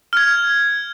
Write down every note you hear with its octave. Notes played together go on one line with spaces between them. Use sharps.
F6 G#6